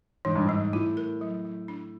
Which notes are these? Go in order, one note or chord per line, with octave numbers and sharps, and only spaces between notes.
G#2 E3
G2
G#2 G3
A2 F4
A#4
F#3
F#3
D4